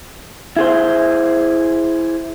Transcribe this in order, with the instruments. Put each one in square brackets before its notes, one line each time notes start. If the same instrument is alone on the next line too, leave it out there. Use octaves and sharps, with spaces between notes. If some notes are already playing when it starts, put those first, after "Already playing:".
[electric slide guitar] E4 G#4 C5